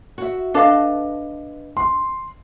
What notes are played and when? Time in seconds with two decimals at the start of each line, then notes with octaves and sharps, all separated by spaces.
0.18 F#4 E5
0.54 D4 A4 B4 D#5 F5
1.77 C6